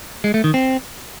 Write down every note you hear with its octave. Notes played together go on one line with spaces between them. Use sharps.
G#3
A3
D#3
C4